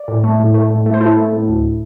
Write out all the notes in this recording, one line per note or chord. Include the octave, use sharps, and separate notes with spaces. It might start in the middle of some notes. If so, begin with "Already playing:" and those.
Already playing: D5
A2
A3
A2
A3
A2
A3
C5
A2 E4 A4
A3
A2
D2